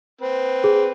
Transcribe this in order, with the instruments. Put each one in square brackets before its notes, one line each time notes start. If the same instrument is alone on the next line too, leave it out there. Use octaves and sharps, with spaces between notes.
[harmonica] C4 B4
[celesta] G#4